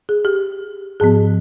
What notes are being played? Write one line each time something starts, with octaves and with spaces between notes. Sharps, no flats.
G#4
G4
G#2 F3 B3 G#4